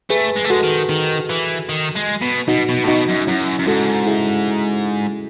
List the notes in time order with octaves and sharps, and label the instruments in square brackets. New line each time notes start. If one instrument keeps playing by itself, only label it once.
[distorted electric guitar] A3 [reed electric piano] G#4 B4
[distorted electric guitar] G#3
A3
[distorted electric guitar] G#3 [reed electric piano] F#4 A4
[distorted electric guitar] D#3
D#3
E3
D#3
G#3
B2
[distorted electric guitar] B2 [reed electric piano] D#4 F#4
[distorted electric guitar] B2
A2
[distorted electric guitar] B2 [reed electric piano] D#4 F#4
[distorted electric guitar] F#2
[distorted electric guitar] F#2 [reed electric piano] C#4 E4
[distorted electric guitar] F#2
[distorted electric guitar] G#2 [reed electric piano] F#4 A4
[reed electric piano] E4 G#4